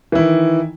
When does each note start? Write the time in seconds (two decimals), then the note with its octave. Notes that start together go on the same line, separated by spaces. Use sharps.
0.12 E3
0.15 E4
0.18 D#3